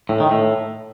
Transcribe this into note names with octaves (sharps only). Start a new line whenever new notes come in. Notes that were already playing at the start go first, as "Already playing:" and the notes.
A2
D#3
A2